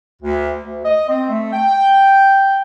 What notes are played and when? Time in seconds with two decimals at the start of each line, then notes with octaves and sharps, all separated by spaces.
0.22 D2
0.60 D2
0.85 D#5
1.08 C4
1.29 A3
1.53 G5